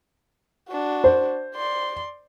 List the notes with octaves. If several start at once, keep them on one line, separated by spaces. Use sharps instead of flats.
D4 F#4
C5
D5 C6